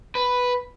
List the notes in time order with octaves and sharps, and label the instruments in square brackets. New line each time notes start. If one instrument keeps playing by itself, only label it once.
[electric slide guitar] B4